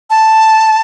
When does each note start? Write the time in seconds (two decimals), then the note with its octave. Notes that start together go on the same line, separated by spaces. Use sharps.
0.10 A5